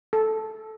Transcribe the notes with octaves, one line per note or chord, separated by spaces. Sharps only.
A4